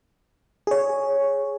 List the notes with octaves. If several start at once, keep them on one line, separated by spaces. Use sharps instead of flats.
G#4 C#5